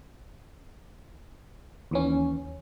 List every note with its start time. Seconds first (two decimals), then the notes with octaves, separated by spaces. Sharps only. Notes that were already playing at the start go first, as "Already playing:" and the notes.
1.91 D#2 E3 C#4